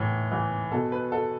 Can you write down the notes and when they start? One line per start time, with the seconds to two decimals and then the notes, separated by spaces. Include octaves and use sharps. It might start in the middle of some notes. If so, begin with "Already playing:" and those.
Already playing: A2 E3
0.32 E3
0.72 B2 A4
0.92 B4
1.12 A4